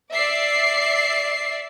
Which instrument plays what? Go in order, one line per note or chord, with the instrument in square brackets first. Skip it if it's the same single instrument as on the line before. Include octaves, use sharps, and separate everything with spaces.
[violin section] D5 E5 C7